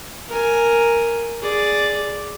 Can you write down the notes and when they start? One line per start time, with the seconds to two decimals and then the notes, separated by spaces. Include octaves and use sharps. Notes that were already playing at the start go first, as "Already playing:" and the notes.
0.29 A#4 G#5
1.42 G#4 D5